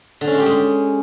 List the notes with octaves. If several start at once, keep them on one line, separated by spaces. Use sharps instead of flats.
D3
C#4
G#3
G4
G#3